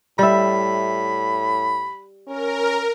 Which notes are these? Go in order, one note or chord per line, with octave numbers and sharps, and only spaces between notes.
A2 G3 E5 B5
C#4 A#4